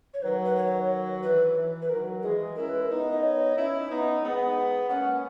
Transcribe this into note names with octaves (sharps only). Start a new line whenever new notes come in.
C#5
D#3 F#3 B4
B4
C#5
E3 B4
E3
B4
D#3 F#3 A#4
E3 G#3 G#4
C#4 E4 A#4
B4
A#4
B3 D#4
D#5
C#5
C#4 E4
B3 D#4
G#3 B3
A#3 C#4 F#5